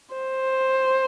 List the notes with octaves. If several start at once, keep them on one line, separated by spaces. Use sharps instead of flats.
C5